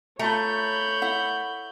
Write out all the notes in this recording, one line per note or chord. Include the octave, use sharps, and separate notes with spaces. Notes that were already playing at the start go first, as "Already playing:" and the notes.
A3 F4 C#5 A#5 B5 G6
E4 F#5